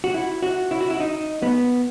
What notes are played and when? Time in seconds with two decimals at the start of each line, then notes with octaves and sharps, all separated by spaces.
0.04 F#4
0.14 E4
0.43 F#4
0.71 E4
0.81 F#4
0.90 E4
1.00 D#4
1.43 B3